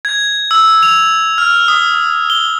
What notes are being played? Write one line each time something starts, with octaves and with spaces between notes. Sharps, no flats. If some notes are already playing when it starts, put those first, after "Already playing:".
G#6
E6
F7
F6
D#6
G7